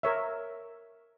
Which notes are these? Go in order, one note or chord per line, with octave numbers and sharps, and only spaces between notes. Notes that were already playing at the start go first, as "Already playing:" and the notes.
A#4 C#5 E5